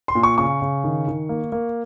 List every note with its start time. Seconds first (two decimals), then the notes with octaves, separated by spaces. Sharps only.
0.08 C6
0.15 A#2
0.23 C#6
0.38 C#3 C#6
0.62 C#3
0.84 D#3
1.07 D#3
1.29 A#3
1.52 A#3